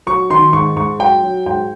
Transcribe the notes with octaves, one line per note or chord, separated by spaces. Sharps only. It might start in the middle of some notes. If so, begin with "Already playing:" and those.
F#3 C#6
D#3 C6
G#2 C#6
G#2 C#6
F#3 G5
F#3
G#2 G5